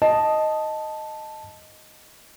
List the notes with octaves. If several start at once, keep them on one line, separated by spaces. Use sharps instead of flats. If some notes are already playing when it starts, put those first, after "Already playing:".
D#5 A5